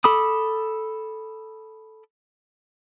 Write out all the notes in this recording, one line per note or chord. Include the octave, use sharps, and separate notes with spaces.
A4 B5 D6 D#6